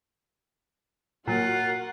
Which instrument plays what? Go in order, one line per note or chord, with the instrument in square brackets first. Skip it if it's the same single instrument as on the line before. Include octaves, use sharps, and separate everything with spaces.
[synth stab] A#2 F#3 [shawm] F4 [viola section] F#4 A#4 F#5